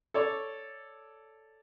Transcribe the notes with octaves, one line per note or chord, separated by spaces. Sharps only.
A4 C#5 D5